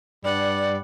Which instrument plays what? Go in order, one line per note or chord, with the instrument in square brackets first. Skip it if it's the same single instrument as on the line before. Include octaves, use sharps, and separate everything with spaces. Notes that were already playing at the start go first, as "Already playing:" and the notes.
[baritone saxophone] G2 [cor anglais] G3 [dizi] D5 [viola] F#5